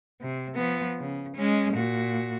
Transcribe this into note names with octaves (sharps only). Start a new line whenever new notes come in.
C3
F3 B3
C#3
G#3 C#4
A#2 F#4